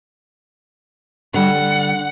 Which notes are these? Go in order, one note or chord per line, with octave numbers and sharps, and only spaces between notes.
D3 G3 F#5 G5